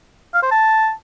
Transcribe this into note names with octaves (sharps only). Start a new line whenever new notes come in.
F5
C5
A5